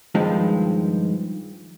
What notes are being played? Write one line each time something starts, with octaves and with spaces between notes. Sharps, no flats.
G2 D#3 F3 G#3